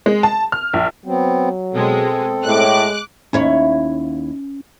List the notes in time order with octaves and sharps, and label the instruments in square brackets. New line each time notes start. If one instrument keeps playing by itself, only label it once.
[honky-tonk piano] G#3
A5
F6
A#1
[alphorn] F#3 [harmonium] B3 C4
[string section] B2 G#3 [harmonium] C4 A4
[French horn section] A2 [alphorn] G#3 [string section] D6 F#6
[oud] D#2 E4 C#5 [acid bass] C#4